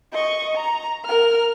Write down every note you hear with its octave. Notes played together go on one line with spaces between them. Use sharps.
D#5 C#6
A#5
A#4 F6